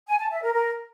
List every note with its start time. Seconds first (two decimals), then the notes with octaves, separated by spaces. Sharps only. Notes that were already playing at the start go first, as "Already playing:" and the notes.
0.08 G#5
0.20 A5
0.31 E5
0.43 A#4
0.54 A#4